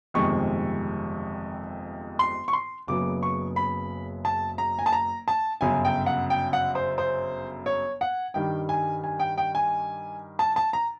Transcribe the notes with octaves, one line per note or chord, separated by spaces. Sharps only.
G1 F2 C3 D#3 G#3 C#6
C6
C#6
C6
F#1 F#2 C#3 F#3 B3 D6
C#6
B5
A5
A#5
G#5
A5
A#5
A5
G1 F#2 C#3 F#3 G#5
G5
F#5
G5
F#5
C5
C5
C#5
F#5
G2 D#3 G3 G5
G#5
G#5
G5
G5
G#5
A5
A5
A#5